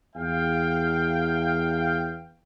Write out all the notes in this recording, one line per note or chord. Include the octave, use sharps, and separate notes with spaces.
E2 F5 G5